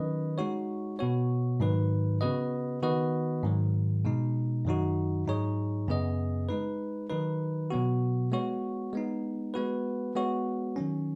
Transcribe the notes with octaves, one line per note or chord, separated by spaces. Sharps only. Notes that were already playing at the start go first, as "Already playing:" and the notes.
Already playing: D#3 F#3 C#4 B4 D#5
G#3 D#4 F#4 C#5
B2 B3 F#4 C#5
G#2 D#3 F#3 D#4 B4
C#3 B3 F#4 B4 D#5
D#3 B3 F#4 B4 D#5
G#2 D#3 F#3
B2 G#3 D#4
F#2 D#3 F#3 D#4 F#4
G#2 F#3 D#4 G#4 C#5
F#2 C#3 B3 G#4 D#5
G#3 D#4 B4
D#3 F#3 D#4 B4
B2 F#3 B3 F#4
G#3 B3 F#4 C#5
G#3 B3 D#4
G#3 B3 F#4 B4
G#3 B3 F#4 C#5
D#3 F#3 C#4